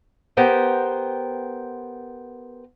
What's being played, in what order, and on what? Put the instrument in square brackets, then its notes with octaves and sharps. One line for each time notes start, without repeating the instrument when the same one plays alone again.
[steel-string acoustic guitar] B3 G4 A#4 C5 G5